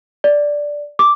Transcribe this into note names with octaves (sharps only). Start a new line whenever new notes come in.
D5
D6